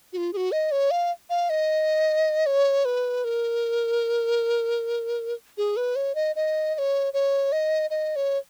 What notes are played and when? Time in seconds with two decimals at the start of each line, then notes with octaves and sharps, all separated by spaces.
0.13 F#4
0.17 F4
0.33 G#4
0.37 F#4
0.52 D#5
0.72 C#5
0.91 F5
1.30 F5
1.50 D#5
2.46 C#5
2.85 B4
3.24 A#4
5.58 G#4
5.77 B4
5.96 C#5
6.15 D#5
6.36 D#5
6.75 D#5
6.78 C#5
7.13 C#5
7.52 D#5
7.90 D#5
8.16 C#5